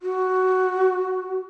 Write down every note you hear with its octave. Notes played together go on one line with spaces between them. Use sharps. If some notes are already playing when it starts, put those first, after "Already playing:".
F#4